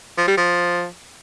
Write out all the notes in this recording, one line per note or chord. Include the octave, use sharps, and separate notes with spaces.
F3
G3
F3